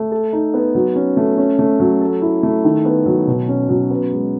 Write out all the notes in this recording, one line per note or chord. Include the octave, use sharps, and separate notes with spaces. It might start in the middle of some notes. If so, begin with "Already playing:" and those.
Already playing: A3
A4
D#4
B3
F#3
C#4
A3
C#4
A3
F#3
A4
E4
A3
D#3
B3
F#3
B2
C#4
F#3
B3
G#3